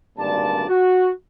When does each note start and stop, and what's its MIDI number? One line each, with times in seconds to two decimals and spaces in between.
0.18 0.65 32
0.18 0.65 38
0.18 0.65 43
0.18 0.65 46
0.18 0.65 74
0.18 0.65 81
0.69 1.10 66